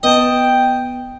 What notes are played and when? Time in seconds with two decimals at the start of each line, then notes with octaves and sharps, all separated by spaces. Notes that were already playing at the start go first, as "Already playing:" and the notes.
0.03 B3 D#5 G5 A5